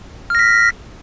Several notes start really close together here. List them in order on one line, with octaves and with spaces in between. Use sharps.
F6 A#6 B6